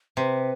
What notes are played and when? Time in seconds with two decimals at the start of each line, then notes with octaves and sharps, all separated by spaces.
0.17 C3 B4